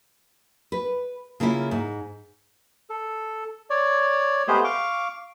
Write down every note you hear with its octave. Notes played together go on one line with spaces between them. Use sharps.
B4
C#3 A#3 C#4 E4 F4
G#2
A4
C#5 D5
G#3 A3 B3 G4 G#4 C5
F5 C#6 D6